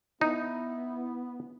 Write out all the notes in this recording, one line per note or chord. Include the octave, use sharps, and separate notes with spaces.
B3 D#4 E4